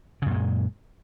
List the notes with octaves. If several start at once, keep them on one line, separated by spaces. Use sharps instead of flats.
F#2 A#2 C#3 G#3